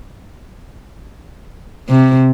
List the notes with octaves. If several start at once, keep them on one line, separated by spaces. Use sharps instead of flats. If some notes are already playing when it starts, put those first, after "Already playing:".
C3